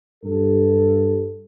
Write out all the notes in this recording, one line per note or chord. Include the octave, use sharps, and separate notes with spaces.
G2 A4